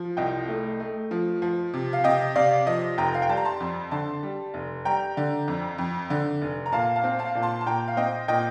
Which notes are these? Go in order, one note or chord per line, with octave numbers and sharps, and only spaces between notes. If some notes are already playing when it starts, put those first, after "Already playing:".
Already playing: F3
C2 D#5 G5
A3
A3
F3
F3
C3
F5
C3 D#5 G5
C3 D5 F5
F3 D#5
F1 G5 A#5
F5
G5
G3 A5
A#5
A5 C6
F2
D3 A5 C6
G3
F1
G3 G5 A#5
D3
F2
F2
D3
F1
A#5
A#2 F5 A5
F5 A5
C4
F5 A5
A#2
A5 C6
A5
A#2 G5 A#5
F5
C4 D#5 G5
A#2 D#5 G5